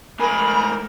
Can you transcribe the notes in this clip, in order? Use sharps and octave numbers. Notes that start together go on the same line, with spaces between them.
G#2 A3 A#4 G#5 B5